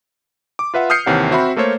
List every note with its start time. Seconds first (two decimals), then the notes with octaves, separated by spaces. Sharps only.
0.59 D6
0.74 F4 B4 E5 F#5
0.90 D#6 F6 G6 C7 C#7
1.06 D#2 C3 E3 C#5 F#5
1.31 C4 F#4 E5 B5
1.56 A3 A#3 A4 C5 C#5